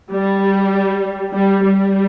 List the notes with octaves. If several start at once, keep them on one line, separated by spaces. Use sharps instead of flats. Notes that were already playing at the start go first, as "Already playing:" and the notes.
G3
G3
G3